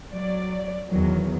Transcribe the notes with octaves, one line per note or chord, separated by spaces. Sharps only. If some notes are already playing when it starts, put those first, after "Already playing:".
F#3 D5
E2 D#3 F#3